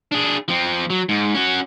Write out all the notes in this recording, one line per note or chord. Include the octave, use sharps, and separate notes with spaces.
D4 G#4
F3 C4
F#3
G#2
C#4 F#4